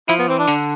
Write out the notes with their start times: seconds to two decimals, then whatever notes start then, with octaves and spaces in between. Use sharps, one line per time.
0.09 F3 E4
0.19 B3
0.28 E3 C4
0.39 D4
0.48 D3